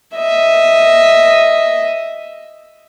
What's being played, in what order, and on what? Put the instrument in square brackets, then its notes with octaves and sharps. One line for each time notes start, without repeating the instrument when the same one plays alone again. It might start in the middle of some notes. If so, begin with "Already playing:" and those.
[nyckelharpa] D#5 E5